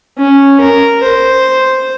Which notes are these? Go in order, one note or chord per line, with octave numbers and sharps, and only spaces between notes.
C#4
A#4
C5